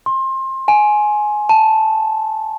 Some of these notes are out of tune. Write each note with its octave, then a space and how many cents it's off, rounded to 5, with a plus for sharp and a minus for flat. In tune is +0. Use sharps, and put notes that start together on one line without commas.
C6 +25
G#5 +15
A5 -5